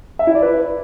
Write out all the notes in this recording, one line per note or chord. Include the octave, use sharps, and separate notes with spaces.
E5
E4
D5
B4